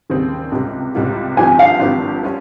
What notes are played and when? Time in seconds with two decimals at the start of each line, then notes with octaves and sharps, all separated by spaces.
0.10 D#2 C#3 G3 C4
0.52 C#2 C3 G3 C#4 F4
0.94 C#2 C3 G3 C#4 F4
1.37 G#1 G2 F3 C4 G4 G#5
1.59 F5
1.80 G#1 G2 F3 C4 G4
2.23 G3 C#4 F4